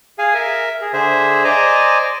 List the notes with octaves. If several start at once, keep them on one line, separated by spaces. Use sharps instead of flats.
G#4 F5 G#5
A#4 E5
G#4
D3 G#4 C5 E5
C5 D5 D#5 G#5 A#5 D6